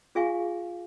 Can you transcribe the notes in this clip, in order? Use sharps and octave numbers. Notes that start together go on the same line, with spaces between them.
F4 G#4 E5 F5 G#5 C#6